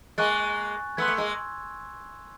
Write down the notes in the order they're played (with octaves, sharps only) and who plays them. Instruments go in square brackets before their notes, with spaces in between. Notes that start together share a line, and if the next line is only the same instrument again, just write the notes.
[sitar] G#3 A#3 [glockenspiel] G#5 C#6 F#6 A6
[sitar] A3 B3 [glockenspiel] C6 E6 G#6
[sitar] A3
G#3 A#3